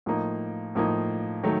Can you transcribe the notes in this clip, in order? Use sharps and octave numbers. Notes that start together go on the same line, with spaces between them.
A2 F3 A#3 D#4
A2 F3 A#3 D#4
D#3 F#3 A3